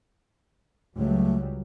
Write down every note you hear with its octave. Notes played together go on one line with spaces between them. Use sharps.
C#2 F#3 G3 A3